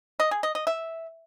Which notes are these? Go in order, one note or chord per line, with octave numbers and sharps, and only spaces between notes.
D#5
G#4
D#5
D#5
E5